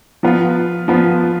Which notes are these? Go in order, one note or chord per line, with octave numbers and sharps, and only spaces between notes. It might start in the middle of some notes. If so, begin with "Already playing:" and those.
F3 B3 F4
F3 B3 F4